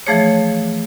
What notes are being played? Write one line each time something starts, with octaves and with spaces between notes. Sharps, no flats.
E3 F3 A3 G#4 C#5